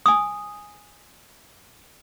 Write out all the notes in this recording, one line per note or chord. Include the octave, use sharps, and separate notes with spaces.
G#5 D#6